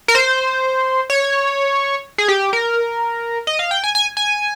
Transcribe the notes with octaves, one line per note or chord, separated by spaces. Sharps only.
A#4
C5
C#5
G#4
G4
A#4
D#5
F5
G5
G#5
G#5
G#5